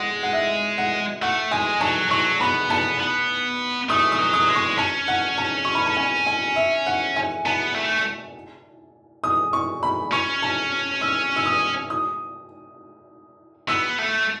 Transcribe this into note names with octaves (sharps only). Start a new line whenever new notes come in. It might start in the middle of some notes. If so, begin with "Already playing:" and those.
Already playing: G#3 F#5
F#5
E5
F#5
A3 F#5
G#3 G#5
F#3 A5
F#3 C#6
B3 B5
B3 A5
B3
A3 D#6
D#6
F#3
D#6
G#3
C#6
C#4 A5
F#5
A5
C#6
B5
A5
G#5
G#5
E5
F#5
G#5
B3 A5
A3
D#6
C#6
B5
C#4 C#6
A5
E6
E6
D#6
D#6
B3 E6
A3